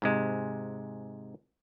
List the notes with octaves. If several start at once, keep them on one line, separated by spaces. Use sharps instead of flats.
G#2 C3 G#3